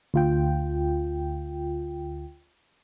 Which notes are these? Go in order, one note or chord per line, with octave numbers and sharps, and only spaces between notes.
D2 F4 G5